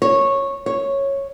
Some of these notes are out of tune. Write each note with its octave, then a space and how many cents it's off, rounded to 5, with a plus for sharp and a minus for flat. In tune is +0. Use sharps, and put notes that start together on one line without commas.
C#5 -10
C#5 -5